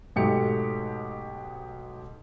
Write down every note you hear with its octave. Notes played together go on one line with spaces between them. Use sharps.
G#2 B2 F#3 A3 G4 C#7